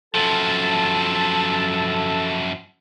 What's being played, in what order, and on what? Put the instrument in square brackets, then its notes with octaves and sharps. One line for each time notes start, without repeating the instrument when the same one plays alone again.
[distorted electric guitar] F#2 F3 [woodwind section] A4 A5